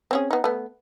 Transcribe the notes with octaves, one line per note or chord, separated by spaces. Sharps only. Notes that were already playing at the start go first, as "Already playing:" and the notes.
C4 C#4 G#4
B3 D#4
A3 B3